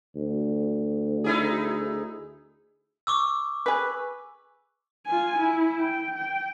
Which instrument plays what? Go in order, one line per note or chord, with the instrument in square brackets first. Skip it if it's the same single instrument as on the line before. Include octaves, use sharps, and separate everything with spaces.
[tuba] D2
[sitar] D#4 E4 G#4
[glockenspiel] C#6 D6 E6
[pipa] G#4 B4
[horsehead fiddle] F4 G#5
E4
G5
G5